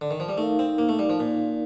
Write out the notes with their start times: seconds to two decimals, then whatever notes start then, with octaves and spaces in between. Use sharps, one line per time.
0.01 D3
0.11 D#3
0.20 F3
0.29 G3
0.38 A3 D#4 A#4 F5
0.59 C4
0.78 A#3
0.89 A3
0.99 G3
1.10 F3
1.20 A#2